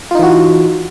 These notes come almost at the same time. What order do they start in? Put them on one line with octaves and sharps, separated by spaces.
F4 D#4 E3 F#4